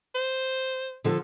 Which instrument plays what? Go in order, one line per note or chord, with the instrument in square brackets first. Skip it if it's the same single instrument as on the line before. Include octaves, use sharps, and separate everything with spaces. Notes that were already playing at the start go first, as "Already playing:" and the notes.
[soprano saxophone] C5
[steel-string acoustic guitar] D3 F3 A4